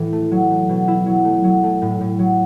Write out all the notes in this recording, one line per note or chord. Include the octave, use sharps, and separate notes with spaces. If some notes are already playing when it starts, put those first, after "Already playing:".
Already playing: A2 E3
A3
F#3
A3
B2
E4
F#3
A3
F#3
A3
A2
A2
F#3